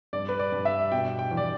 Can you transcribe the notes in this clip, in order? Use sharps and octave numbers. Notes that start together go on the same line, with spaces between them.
G2 D5
B4
D5
G2
E5
B2 G5
G5
E2
D5